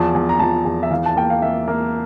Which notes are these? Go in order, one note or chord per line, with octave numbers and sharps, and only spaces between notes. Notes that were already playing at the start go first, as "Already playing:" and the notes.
Already playing: E2 F3 A5
E2
A#5
F3 A5
E2
E5
E3 F5
A5
A#3 G5
F5
A#3 E5
A#3